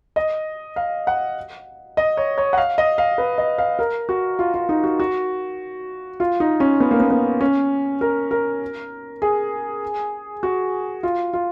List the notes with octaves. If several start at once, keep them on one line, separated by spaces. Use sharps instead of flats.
D#5
F5
F#5
D#5
C#5
C#5
F#5
F5
D#5
F5
B4
D#5
F5
A#4
F#4
F4
F4
D#4
F#4
F#4
F4
D#4
C#4
B3
A#3
B3
B3
C#4
A#4
A#4
G#4
F#4
F4
F4